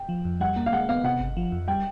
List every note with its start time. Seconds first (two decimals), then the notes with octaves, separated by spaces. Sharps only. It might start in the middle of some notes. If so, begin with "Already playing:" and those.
Already playing: G5
0.09 F3
0.25 F2
0.40 G3 F#5
0.56 A#3
0.66 F5
0.72 G#3 F#5
0.89 B3 F5
1.04 C3 F#5
1.20 G1
1.37 F3
1.52 F2
1.68 G3 G5